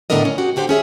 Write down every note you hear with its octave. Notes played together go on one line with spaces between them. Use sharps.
A2 D3 B3 D4 A#4 D#5
C#4
G#3 F#4 G4
D3 F#4 G4 C5
D#2 C#4 G#4 E5